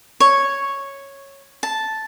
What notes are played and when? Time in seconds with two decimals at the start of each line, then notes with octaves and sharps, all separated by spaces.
0.20 C#5
1.63 A5